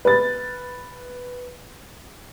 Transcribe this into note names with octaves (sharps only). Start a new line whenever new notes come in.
B4 A6